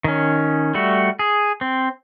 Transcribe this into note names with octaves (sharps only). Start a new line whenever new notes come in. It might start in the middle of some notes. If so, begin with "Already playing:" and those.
D#3 C#4
G3 A3 F#4
G#4
C4